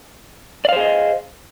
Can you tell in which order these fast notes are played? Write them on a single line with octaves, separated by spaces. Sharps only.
D5 F5 C5 G#4 D#5